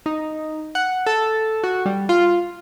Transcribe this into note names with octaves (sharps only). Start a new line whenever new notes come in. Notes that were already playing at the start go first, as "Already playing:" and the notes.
D#4
F#5
A4
F#4
G3
F4